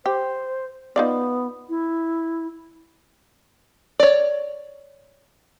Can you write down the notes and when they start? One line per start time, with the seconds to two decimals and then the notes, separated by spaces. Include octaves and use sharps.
0.06 G4 C5
0.96 B3 D#4 F4 D5
1.69 E4
3.99 C#5 D5